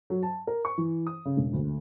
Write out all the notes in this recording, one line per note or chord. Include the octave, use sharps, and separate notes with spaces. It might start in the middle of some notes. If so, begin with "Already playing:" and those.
F#3
A5
A#4
C#6
E3
D#6
C#3
E1
D2